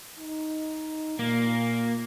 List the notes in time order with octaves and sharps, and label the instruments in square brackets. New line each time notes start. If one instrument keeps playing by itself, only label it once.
[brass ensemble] D#4
[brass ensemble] A#2 [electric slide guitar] A#3